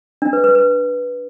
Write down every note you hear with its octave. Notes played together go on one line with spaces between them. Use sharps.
D4
B4
B4
B4